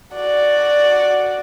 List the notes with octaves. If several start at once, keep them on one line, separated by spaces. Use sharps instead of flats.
F#4 D5